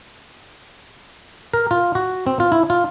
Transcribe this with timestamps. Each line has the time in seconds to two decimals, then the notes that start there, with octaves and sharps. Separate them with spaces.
1.54 A#4
1.71 F4
1.95 F#4
2.27 C4
2.40 F4
2.52 E4
2.70 F4